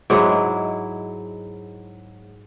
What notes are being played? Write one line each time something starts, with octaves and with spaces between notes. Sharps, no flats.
G#2 F#3 G#3 E4